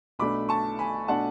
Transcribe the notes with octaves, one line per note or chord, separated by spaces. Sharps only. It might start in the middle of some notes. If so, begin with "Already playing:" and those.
B1 B2 A3 D4 B5 D6
A5 C#6
G#5 B5
B2 A3 D4 F#5 A5